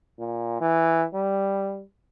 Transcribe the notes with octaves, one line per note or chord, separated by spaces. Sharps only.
A#2
E3
G3